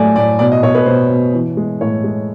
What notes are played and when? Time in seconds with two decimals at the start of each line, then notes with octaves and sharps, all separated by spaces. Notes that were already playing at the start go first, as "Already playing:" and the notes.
Already playing: A2 F#3 A3 D5 G#5
0.16 A2 D5
0.39 B2 D5
0.52 D#5
0.62 B2 C#5
0.75 B4
0.86 B2 C5
1.10 B2
1.34 E3
1.57 G#3
1.81 A2 C#5
2.04 G#3